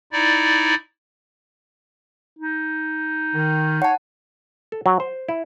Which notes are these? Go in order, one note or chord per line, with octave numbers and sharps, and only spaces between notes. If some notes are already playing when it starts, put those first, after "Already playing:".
D#4 E4 D5
D#4
D#3
C#5 F#5 A5
A4
F#3
C5
E4